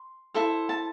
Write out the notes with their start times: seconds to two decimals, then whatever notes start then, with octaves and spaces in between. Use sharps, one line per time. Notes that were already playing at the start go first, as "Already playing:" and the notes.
Already playing: C6
0.34 E4 A4 C5
0.69 A5